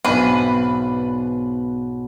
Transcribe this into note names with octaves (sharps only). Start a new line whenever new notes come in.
B1 G#2 B3 C4 D4 B4 G#5